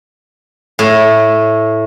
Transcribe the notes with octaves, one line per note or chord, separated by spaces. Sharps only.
A2